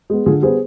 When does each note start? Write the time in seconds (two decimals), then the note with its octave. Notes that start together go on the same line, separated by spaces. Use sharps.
0.10 G#3 B3
0.26 D3 F4 G#4
0.42 G3 B3 G#4 C5